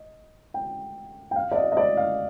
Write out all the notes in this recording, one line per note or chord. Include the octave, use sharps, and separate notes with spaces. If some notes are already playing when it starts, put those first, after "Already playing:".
Already playing: D#5
G5
G5
F5
D5
D#5
D#5
D5
F5